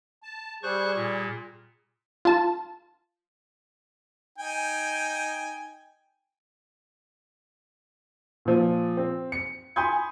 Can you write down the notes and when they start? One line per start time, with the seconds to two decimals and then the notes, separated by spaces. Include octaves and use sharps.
0.23 A5
0.63 G3 G#4 C5 C#6 F#6
0.95 A#2
2.25 F4 A5
4.38 D#4 G5 G#5
8.45 A#2 F3
8.97 C4
9.32 C#7
9.76 G#5 B5 C6 D#6 G6 G#6